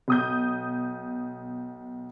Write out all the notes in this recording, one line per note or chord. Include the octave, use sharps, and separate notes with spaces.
B1 D#6 G6